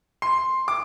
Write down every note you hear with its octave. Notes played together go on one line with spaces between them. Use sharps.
C6
D6